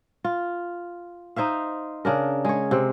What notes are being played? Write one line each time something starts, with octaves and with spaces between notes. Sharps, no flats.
F4
D#4 C5 E5 F5
C#3 D4 A#4
G#3 C#5
C3 C4